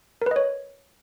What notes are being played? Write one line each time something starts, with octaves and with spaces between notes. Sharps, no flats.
A#4 B4 C#5 D#5